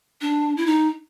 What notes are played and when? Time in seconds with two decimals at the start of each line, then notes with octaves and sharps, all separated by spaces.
0.21 D4
0.57 E4
0.66 D#4